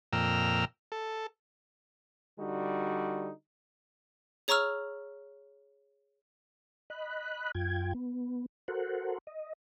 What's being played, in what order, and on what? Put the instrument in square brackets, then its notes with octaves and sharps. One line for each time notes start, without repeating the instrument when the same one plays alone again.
[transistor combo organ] F2 A#2 G5 A#5 E6 F6
A4
[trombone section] D3 G3 D#4 F#4
[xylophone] G#4 C#5 A#5 C#6 E6 F6
[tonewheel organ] D#5 B5 F#6
F#2 F4 G5 G#6
B3
F#4 A4 A#4 C5 F#5
D#5